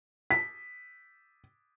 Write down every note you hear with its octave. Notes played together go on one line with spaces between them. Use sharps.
B6